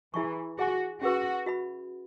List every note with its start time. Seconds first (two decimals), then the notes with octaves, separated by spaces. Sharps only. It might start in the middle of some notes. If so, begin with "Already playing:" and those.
0.14 E3 E4 G#4 E5 G#5 C#6
0.58 F#4 G#4 E5 G#5 C#6
1.02 C#4 F#4 G#4 B4
1.46 F#4 E5 B5